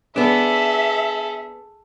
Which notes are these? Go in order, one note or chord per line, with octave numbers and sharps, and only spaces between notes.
B3 D4 G#4 A4 E5